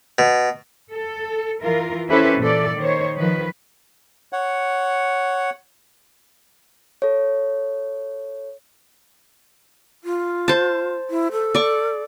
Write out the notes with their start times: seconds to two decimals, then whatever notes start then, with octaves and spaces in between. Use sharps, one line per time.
0.19 B2
0.92 A4
1.62 E3 F4 A#4
2.09 C#4 E4 G4 A4 B4 C5
2.39 A#2 E3 A4 D5
2.77 D#3 C5 C#5
3.18 D#3 F3 B4
4.33 C#5 F#5
7.02 A4 C#5
10.04 F4
10.48 C5 A5
11.10 E4
11.32 A4
11.55 D5 C#6